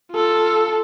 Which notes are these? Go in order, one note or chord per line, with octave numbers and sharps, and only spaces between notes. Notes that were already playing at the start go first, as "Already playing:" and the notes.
F4 A4